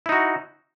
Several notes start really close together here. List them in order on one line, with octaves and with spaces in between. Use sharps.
E4 D#4 F#4